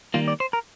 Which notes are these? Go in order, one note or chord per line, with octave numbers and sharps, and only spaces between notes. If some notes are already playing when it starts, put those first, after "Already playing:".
D#3 G3 A#3 F4
D5
C5
A#4